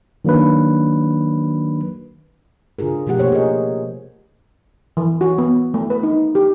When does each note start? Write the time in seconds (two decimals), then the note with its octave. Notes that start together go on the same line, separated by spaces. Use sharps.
0.25 D#3 F#3 A#3 D4 B4
2.79 C#3 D4 F4 G#4 A#4
3.07 B2 F3 A3 G4 F#5
3.19 C3 A#3 C5 C#5
3.32 G#4 A#4 D#5
4.97 E3
5.21 F#4
5.38 B3
5.74 A3
5.90 B4
6.03 D#4
6.35 G4